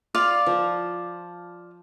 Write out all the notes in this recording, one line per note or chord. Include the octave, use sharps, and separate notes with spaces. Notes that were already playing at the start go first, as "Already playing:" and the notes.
F4 D5 F5
F3